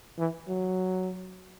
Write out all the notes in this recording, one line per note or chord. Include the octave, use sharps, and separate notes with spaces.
E3
F#3